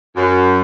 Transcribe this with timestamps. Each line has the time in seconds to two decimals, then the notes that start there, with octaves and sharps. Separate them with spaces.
0.16 F#2